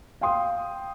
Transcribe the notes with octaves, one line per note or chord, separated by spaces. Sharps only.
F5 G5 C6 D#6